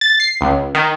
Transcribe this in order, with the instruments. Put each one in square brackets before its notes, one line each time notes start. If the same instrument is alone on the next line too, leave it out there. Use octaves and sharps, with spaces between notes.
[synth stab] A6
C7
C#2
D#3